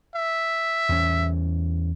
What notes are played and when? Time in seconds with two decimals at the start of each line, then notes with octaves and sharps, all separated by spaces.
0.15 E5
0.89 E2 C#4